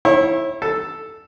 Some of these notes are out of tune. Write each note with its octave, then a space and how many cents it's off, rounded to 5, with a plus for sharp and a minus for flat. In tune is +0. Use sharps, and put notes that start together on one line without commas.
E4 +0 C#5 -40
A4 +0 A5 +0